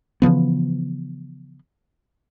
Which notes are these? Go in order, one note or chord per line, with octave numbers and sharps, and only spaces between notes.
C#3 E3 F3 B3